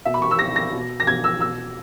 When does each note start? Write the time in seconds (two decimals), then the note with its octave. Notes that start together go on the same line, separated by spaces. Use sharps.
0.05 B2 E5
0.14 B5
0.22 C#6
0.31 E6
0.39 B2 A#6
0.56 A#6
0.73 B2
1.00 A#6
1.07 B2 G#6
1.24 E6
1.40 B2 E6